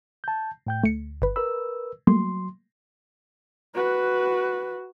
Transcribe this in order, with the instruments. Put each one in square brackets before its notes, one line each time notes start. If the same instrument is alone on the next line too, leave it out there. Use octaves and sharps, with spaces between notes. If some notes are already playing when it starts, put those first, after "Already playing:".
[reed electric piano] A5 G6
A2 G5 G6
[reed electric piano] D2 [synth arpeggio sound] A3 C#7
[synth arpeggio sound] G1 B4
[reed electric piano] A#4 B4 E6 [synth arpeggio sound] B5
[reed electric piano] F#3 C6 [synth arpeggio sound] G3 A3 A#3
[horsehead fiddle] F#4 B4